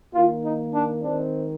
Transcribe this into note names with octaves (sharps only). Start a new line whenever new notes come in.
D#3 A#3 F4
D#4
D4
D#3 G#3 C4 D4